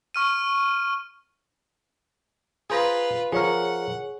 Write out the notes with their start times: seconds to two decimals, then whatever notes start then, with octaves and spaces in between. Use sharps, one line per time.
0.14 C#6 F6 D#7
2.70 F4 G#4 B4 C5 A#5
3.32 F3 G#4 A#4 C#5 F#5